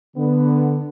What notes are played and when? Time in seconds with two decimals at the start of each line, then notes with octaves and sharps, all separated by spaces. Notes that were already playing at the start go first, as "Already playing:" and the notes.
0.17 D3 B3